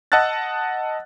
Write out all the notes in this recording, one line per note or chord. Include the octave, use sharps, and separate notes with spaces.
D#5 F#5 A5 E6 F#6 A6